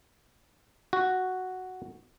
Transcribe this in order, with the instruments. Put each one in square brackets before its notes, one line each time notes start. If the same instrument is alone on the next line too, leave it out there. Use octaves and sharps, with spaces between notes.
[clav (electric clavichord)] F#4